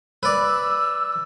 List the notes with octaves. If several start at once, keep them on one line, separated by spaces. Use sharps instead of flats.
B4 D5 E6